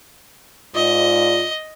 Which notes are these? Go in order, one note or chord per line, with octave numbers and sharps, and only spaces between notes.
G#2 F4 D5 D#5